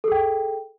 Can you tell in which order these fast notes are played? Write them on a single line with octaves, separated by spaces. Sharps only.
A4 G#4 G5